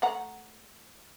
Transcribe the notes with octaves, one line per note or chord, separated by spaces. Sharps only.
A3 F#5 A#5